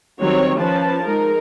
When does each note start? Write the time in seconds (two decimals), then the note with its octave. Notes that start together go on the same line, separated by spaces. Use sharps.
0.19 D#3 F#3 G3 C4 C#5
0.57 F3 C#4 B4 A5
1.02 G#3 D#4 A#4